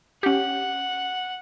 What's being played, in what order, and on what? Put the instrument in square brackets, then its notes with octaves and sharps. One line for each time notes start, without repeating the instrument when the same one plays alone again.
[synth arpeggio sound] C#4 G4 [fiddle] F#5